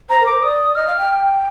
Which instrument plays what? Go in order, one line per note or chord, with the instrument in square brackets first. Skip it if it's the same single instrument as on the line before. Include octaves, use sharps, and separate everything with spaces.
[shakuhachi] C5 [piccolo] A#5
[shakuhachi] A#4
[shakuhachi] C5 [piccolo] D6
[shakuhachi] D5 [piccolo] D#6
[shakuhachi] D#5 [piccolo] F6
[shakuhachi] F5
G5